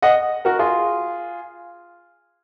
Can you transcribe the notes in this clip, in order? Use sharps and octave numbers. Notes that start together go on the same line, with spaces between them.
D#5 F#5
F#4 A#4
F4 G#4